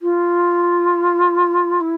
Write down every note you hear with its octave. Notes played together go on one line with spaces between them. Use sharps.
F4
E4